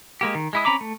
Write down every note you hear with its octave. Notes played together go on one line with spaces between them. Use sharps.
G#3 A#3 G4
D#3
G#3 E4 D#6
C4 C#4 A#5 B5 D6
A3